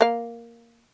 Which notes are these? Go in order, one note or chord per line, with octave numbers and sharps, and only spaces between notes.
A#3 F5